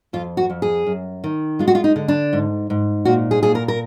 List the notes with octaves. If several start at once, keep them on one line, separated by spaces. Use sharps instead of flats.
F2 F4
F#4
F2
G#4
F#2
D#3
G#3 F4
F#4
F4
D#4
D3
D4
G#2
G#2
A#2 F#4
G#4
A#2 G#4
A#4
A#4